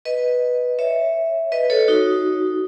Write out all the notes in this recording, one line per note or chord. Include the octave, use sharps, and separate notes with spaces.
B4 D#5
C#5 E5
B4 D#5
A4 C#5
D#4 F#4